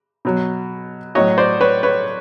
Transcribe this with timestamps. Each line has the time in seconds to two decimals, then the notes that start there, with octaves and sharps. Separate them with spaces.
0.25 B2 F#3
1.15 A2 F#3 C#5 D#5
1.38 C5 D5
1.61 B4 C#5
1.83 B4 C#5